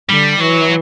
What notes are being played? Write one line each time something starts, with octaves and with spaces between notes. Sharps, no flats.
D3 G3
E3 F#3